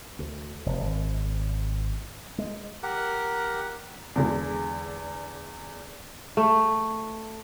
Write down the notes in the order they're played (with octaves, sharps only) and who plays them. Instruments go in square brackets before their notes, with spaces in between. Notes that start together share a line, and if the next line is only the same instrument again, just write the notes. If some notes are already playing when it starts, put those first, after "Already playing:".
[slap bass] D2
F1
G#1
G#3
[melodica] G4 A#4 F#5
[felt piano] E2 D3 G#3
[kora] A3